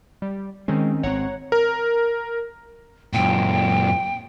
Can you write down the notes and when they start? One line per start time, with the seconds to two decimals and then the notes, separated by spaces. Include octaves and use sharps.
0.22 G3
0.68 D#3 G#3 C4 C#4
1.03 G#1 C4 C#5 F#5 A#5
1.52 A#4
3.14 F#2 A#2 G5